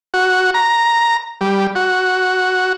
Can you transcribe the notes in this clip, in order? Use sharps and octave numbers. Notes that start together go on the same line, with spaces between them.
F#4
A#5
G3
F#4